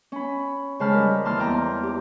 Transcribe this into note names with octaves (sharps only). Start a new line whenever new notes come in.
C#4 B5
C#3 G#3 C5 A5 B5 F6
G3 A#4
D#2 E3 A5 C6 F6
E2 G5 A#5 D#6
G4